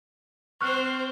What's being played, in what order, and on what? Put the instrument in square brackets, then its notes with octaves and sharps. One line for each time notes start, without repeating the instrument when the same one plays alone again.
[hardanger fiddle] C4 C5 [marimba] C#6 F6 F#6